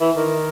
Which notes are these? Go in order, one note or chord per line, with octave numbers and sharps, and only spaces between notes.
E3
D#3